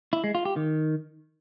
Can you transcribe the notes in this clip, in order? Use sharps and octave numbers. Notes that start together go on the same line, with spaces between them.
E4
G#3
F4
G4
D#3